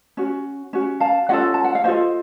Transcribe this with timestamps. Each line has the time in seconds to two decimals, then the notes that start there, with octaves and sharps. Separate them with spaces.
0.17 C#4 F#4
0.73 C#4 F#4
1.00 F5 A5
1.29 C#4 F4 A4 D#5 F#5
1.54 A5
1.64 F#5
1.75 F5
1.84 C#4 F4 A4 C5 D#5